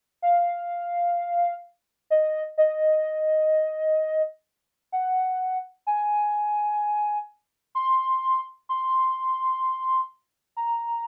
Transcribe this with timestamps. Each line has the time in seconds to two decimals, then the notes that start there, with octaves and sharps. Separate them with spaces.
0.22 F5
2.10 D#5
2.58 D#5
4.92 F#5
5.87 G#5
7.75 C6
8.69 C6
10.57 A#5